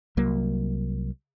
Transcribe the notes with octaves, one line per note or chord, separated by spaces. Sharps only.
C2 F#3 A#3